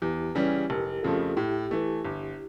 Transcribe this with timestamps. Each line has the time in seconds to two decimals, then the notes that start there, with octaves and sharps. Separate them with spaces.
0.02 E2 E4 G4
0.35 C#3 E3 G3 C#4
0.70 F1 G4 A#4
1.03 F2 C#3 F3 A3 F4 A4
1.37 A2 E4 G4
1.71 E3 A3
2.04 G1